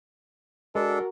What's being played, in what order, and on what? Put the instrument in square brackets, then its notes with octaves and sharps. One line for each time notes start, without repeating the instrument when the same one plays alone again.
[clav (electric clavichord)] G#3 [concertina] D4 A4 [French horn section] F#4 A#4